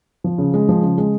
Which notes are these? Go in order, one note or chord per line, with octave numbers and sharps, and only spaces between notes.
F3
C#3
G#3
F3
C#3
G#3